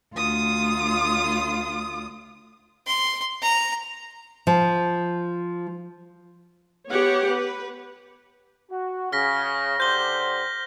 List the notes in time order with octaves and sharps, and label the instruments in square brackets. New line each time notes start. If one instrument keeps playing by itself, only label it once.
[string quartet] D2 F4 D#6
[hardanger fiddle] C6
A#5
[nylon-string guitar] F3
[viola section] B3 G4 C#5 F#5
B4
[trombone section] F#4
[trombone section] C#3 [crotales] F6 A#6 B6
[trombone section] D3 G4 C5 [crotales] G6 G7